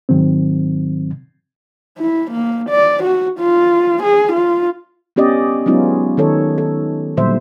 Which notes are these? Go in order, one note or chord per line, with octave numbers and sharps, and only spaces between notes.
G#2 D#3 F#3 C4
E4
A#3
D5
F#4
F4
G#4
F4
B3 C#4 G4 D5 D#5
F#3 G#3 B3 C#4 D#4 F4
D#3 D#4 A4 C#5
A4
A#2 D3 F#3 G3 C5 E5